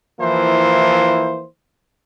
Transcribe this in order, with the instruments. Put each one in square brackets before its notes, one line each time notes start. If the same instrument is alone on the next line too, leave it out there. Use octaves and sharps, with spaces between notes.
[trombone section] E3 F3 A#3 E4 C5